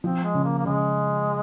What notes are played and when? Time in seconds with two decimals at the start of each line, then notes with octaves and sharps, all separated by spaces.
0.04 F3 C4
0.24 G#3
0.34 C#3
0.44 A#3
0.58 A#3
0.65 C#3 G#3